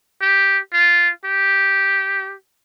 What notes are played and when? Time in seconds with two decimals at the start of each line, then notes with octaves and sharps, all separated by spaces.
0.22 G4
0.73 F4
1.25 G4